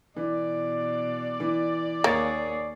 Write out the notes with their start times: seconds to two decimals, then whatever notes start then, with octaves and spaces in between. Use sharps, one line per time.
0.16 B2 E3 D5
1.40 E3
2.04 D#2 A#3 G#4 C#5 A6